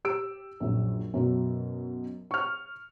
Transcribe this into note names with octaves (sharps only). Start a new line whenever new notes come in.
G4 E6 D7
A#1 F#2
F#2 B2 F#3
C#6 F6